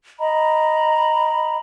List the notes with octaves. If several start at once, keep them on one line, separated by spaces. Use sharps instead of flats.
D#5 A#5 B5